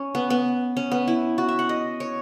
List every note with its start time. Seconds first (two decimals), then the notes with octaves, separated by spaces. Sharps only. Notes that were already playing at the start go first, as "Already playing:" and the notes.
Already playing: C#4
0.15 B3
0.30 B3
0.77 C#4
0.92 B3
1.08 E4
1.38 F#4
1.49 E5
1.59 F#5
1.69 D#5
2.00 C#5